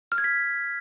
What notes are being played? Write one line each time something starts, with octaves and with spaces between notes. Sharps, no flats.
F6
G#6
B6